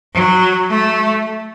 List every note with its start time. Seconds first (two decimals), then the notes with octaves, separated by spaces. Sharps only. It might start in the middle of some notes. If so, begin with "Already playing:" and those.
0.13 F#3
0.69 A3